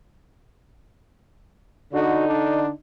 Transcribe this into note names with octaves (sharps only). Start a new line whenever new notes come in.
D3 D#4 F#4
D4